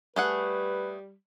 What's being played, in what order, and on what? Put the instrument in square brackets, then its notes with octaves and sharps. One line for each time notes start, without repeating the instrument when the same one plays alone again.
[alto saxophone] G3 [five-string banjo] A3 G#4 F#5 [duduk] B4